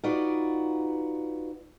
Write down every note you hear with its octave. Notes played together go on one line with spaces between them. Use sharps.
D#4 F4 F#4 B4 D5